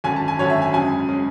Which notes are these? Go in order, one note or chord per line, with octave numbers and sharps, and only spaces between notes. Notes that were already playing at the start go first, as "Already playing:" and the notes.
G#1 F#2 D3 G#5
A5
G#5
G#1 F#2 D3 C#5
E5
G#5
F#2 C#3 G#3 G#5
C#3 G#3